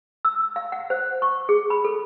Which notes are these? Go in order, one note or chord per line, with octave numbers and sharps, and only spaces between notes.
E6
F5
F#5
C5
C#6
G#4
B5
A4